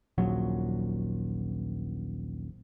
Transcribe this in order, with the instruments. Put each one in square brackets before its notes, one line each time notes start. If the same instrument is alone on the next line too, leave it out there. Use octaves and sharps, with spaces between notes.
[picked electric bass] D#1 A#1 F#3